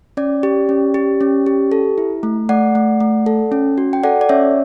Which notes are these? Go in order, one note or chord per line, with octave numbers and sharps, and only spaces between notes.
C#4 D5
G4
C#4
G4
C#4
G4
A4
E4
A3
A3 D5 F#5
A3
A3
A4
C#4
F#4
G5
A4 D5 F#5
D5
C#4 C#5 E5